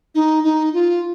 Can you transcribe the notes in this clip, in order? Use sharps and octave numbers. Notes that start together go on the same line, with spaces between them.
D#4
D#4
F4